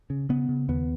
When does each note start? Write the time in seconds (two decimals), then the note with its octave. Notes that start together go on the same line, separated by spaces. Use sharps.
0.10 C#3
0.29 C#3 B3
0.49 C#3
0.69 D#2 B3